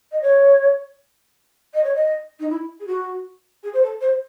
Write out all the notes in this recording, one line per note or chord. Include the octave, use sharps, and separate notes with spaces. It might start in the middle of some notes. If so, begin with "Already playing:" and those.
D#5
C#5
D#5
C#5
D#5
D#4
E4
G#4
F#4
G#4
C5
A4
C5